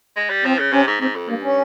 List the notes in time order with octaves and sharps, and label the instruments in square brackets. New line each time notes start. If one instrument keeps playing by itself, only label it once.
[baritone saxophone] G#3
G3
[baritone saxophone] F3 [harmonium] C4
[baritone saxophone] C#3
[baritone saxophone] C3 [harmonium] C#4
[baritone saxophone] G#2
[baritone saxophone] G#2 [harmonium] C4
[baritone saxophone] F2
[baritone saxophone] G2 [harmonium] A#3
[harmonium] C#4